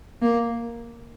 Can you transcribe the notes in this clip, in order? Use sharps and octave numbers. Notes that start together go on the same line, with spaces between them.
A#3